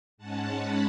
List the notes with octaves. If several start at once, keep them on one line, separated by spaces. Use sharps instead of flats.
G#2 G#3 C#4 F#5 A5
B5